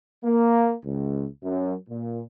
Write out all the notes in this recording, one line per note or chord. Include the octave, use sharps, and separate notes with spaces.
A#3
C#2
F#2
A#2